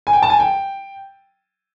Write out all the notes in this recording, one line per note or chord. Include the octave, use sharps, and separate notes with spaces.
G#5
G5
A5
G#5
G5